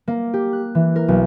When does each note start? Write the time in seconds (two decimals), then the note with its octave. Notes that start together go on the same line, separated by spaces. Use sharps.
0.08 A#3
0.33 G4
0.53 F#6
0.75 E3
0.96 A#4
1.08 B1